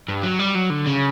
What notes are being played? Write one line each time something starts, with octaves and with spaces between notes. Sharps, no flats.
G2
F#3
G3
F#3
D3
C#3